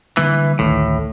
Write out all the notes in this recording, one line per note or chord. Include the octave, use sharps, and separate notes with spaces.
D3 E3 G3 A#3
A1 D2 A2 D#3